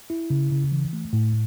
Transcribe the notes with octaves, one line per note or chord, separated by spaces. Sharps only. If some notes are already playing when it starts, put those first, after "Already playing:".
E4
C#3
C#3
E3
A3
A2